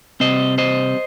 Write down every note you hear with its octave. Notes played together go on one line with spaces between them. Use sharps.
C3 G3 C4 C5 D#5
C5 D#5